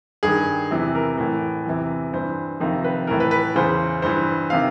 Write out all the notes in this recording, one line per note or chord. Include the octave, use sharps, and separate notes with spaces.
G2 D#3 G#4
E2 C3 E3
A#4
A2 E3
E2 C3 E3
G2 E3 C5
F2 C3 D#3
B4
A2 E3 A#4
B4
B4
E2 C#3 E3 C5
G2 E3 C5
C3 D#3 F5